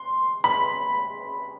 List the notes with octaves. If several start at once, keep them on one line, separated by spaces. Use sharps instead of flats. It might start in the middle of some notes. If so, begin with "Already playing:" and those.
Already playing: C6
B5